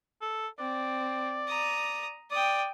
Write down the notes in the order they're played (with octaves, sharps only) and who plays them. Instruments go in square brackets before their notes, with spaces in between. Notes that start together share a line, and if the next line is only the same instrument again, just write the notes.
[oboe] A4
[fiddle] C4 [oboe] D5
[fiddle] A#5 D#6
[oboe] D5 [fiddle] G5 D#6